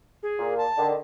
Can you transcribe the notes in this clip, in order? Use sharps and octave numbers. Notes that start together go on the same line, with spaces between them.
G#4
A#2
A5
D3 D#3